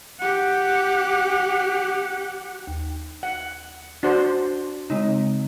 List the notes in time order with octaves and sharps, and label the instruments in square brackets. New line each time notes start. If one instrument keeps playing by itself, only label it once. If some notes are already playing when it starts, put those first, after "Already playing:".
[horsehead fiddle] G4 F#5
[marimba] D#2
[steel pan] F#5
D4 F#4 C5
[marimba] C#3 G#3 C4 [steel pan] D#4